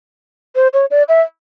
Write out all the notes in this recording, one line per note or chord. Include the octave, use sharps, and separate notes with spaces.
C5
C#5
D5
E5